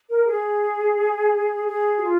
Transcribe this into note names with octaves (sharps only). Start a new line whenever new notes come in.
A#4
G#4
G#4
F#4
F4